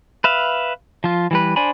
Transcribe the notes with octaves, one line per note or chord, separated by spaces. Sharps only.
B4 E5 F5
F3 F4
E3 G3 B4
D4 C5 D5 G#5 B5